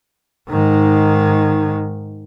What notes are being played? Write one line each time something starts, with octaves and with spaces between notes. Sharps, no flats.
G#2 D#3